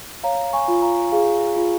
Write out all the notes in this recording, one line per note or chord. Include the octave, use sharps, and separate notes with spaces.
C#5 F5 A#5
G#5 C#6
F4
F5 A#5
G#4 F5
F4